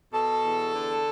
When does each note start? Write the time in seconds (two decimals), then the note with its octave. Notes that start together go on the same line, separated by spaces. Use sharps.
0.13 B2 A4
0.44 E2
0.74 D3